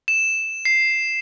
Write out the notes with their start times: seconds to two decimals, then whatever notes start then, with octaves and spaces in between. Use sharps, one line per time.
0.08 E7
0.65 C7